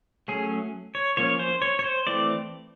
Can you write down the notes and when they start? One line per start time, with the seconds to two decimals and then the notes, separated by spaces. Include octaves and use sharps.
0.28 F#3 A3 C#4 G#4
0.95 C#5
1.17 F3 A#3 C#4 C#5
1.39 C5
1.62 C#5
1.79 C#5
1.84 C5
2.07 E3 A3 C4 D5